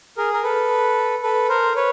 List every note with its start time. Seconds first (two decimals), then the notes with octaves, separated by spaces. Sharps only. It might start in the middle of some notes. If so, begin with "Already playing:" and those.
0.17 G#4 A#4
0.33 A#4
0.43 A4 B4
1.23 A4 B4
1.49 A#4 C5
1.76 B4 C#5